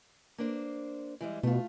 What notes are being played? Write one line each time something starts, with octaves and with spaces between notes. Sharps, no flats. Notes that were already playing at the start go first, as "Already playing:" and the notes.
A#3 D4 C5
E3 G3 G#3
B2 A3 F4